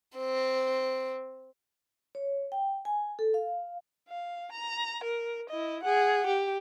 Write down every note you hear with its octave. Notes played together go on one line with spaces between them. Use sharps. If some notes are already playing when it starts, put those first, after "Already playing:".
C4
C#5
G5
G#5
A4
F5
F5
A#5
A#4
E4 D#5
G#4 F#5
G4